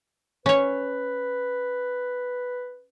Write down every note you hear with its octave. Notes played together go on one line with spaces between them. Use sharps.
C#4 B4 C#5